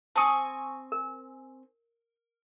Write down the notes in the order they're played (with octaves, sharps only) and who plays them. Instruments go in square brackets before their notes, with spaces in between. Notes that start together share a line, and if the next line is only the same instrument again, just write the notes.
[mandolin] C4 G#5 C#6 [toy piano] A5 D#6
[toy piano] A#4